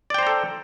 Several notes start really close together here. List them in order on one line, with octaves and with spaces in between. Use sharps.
D5 G5 C5 A#5 A4